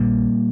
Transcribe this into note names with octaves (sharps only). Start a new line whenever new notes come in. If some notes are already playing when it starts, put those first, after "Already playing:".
Already playing: A#1 A#2 G3 A#3